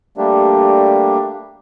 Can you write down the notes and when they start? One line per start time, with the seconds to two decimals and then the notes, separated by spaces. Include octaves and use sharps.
0.17 G3 A3 A#3 D4 G4